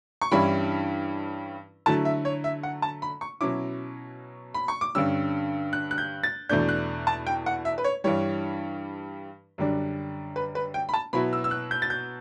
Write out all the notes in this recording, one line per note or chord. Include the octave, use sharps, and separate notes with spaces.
C#6
G2 E3 G3 C#4 E4 B5
D3 F#3 A3 E4 A5
E5
C#5
E5
F#5
A5
B5
C#6
B2 F#3 C#4 E4 D6
B5
C#6
D6
G2 D3 G3 C#4 E6
F#6
F#6
G6
A6
E2 B2 A3 D4 G6
F#6
A5
G5
F#5
E5
B4
C#5
G2 E3 G3 C#5
F#2 D3 G3 D4
B4
B4
G5
B5
A5
B2 F#3 B3 E4 B5
E6
E6
F#6
G6
A6
G6